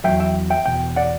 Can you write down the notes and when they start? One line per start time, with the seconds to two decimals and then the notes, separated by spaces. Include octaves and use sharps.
0.04 E2 B2 F#3 E5 G5
0.20 E5 G5
0.50 E5 G5
0.66 E2 B2 G5
0.96 D5 F#5